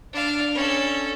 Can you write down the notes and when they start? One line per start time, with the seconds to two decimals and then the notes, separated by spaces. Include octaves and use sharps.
0.13 D4 F5
0.54 C#4 A4